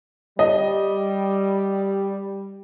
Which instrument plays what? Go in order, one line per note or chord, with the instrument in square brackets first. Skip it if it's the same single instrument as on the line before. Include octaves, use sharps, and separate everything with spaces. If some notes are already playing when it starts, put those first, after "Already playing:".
[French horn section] G3 [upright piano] D#5